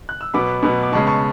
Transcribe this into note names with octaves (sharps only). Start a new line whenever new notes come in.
F#6
E6
B2 F#3 B3 B5 D6
B2 F#3 B3
D6
C#3 G#3 B3 A5 C#6
A5 C#6